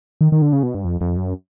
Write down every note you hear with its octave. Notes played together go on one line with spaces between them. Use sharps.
D#3
D#3
D3
C#3
B2
G2
F2
F2
F#2